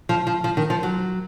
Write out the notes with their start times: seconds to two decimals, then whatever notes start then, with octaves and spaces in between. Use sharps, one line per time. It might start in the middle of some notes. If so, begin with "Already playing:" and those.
0.09 F3
0.27 F3
0.44 F3
0.57 D#3
0.70 F3
0.83 F#3